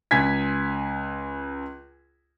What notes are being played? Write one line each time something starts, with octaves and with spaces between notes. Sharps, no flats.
C#2 G#5 G#6 B6